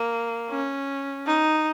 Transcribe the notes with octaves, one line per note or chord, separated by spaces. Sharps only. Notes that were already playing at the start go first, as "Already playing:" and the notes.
Already playing: A#3
C#4
D#4